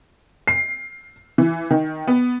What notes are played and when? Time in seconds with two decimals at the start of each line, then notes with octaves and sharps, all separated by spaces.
0.48 C7
1.38 E3
1.71 D#3
2.07 B3